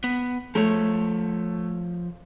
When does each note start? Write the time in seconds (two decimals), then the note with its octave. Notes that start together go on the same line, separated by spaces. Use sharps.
0.04 B3
0.55 F3 A3 C#5